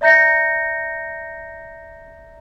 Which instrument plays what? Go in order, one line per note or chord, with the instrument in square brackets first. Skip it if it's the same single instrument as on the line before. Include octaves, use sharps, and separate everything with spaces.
[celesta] D5 E5 A#5 G6 A#6 C#7